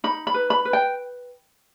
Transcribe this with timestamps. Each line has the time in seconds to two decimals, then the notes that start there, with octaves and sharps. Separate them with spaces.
0.04 D#4 B5
0.27 B5
0.34 B4
0.50 B5
0.65 B4
0.73 G5